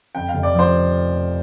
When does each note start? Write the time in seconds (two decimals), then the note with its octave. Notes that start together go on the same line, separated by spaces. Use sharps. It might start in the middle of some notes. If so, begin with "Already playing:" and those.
0.15 F2 G5
0.29 F5
0.34 F1
0.43 D5
0.54 F3 C5